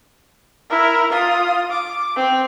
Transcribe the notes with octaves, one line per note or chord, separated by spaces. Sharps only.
E4 A#4
F4 D#6
D6
C4